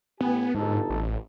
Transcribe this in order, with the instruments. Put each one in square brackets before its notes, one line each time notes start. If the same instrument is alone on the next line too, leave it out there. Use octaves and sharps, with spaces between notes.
[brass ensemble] A1 G4 G#5 [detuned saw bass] B3
[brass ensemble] G1 D#4 A4 [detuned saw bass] G#2
[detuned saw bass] A1